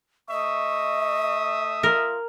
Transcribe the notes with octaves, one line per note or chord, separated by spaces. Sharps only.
A3 D#5 E5 C#6 D#6
F4 A#4